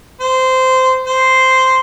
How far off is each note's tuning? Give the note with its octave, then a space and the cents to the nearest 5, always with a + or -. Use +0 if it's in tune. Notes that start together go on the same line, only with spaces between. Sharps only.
C5 -15
C5 -5